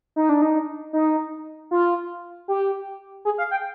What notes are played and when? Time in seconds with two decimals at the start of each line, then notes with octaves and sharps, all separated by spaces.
0.16 D#4
0.29 D4
0.42 D#4
0.93 D#4
1.71 F4
2.48 G4
3.25 G#4
3.38 F5
3.51 G5